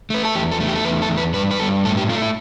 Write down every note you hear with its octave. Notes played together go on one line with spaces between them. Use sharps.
A3 B4
A4
E2 G4
A4
A3
G4
A4
E2 B4
A4
E2
B4
G2 B4
B4
G2 A4
A2 A4
G4
A3 F4
E4